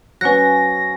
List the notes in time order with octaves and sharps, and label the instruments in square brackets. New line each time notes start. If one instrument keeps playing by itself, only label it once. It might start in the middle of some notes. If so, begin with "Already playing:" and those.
[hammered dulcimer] F#3 C#4 [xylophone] B4 F#5 F#6 [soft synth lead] A#6